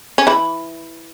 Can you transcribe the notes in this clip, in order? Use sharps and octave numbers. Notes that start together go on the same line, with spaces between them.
C#4
E3 E4